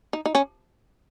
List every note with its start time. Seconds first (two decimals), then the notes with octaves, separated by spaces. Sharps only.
0.13 D#4
0.26 D#4
0.35 C#4